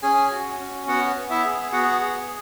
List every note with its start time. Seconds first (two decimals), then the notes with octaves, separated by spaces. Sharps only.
0.03 C#4 G#4 G#5
0.31 F#4
0.59 C#4
0.87 B3 F#4 F#5
1.16 B3
1.30 E4 E5
1.45 G#4
1.72 B3 F#4 F#5
2.01 G#4